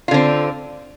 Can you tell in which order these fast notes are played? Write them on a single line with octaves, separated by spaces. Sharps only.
F4 D3 C4